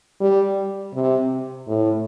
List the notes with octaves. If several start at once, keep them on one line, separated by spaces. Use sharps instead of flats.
G3
C3
A2